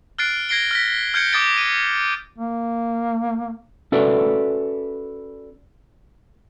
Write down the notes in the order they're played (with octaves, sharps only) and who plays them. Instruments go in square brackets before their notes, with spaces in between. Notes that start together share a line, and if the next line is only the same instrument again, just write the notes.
[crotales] F6 F#6 A6 C7 D7
G#6 A#6 C7 D7 G7
F6 A#6 B6
F6 G6 G#6 C#7 D7 G7
D6 D#6 A6 D7
D#7
[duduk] A#3
[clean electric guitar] C#4 F#4 A4 B4 D5 E5